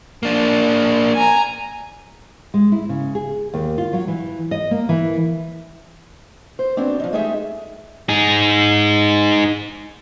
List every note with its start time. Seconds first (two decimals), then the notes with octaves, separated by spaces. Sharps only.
0.23 A#3 D4
1.14 G#5 A#5
2.54 G#3
2.72 E4
2.89 C#3
3.15 G#4
3.54 D#2
3.78 F4
3.93 F#3
4.08 E3
4.51 D#5
4.71 A#3
4.89 E3
6.59 C5
6.77 F#3 B3 C4 D4
7.00 F3 D4 D#4
7.13 G#3 A3 D#4 G4 G#4 E5
8.09 D#4 G#4